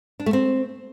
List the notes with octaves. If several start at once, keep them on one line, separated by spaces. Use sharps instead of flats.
D4
A3
C4